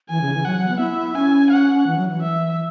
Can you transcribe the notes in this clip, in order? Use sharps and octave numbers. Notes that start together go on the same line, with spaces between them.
E3 G#5
C#3
E3
F#3 F#5
F#3
B3
E4 E5
C#4 G#5
F#5
E3
F#3
E3
E5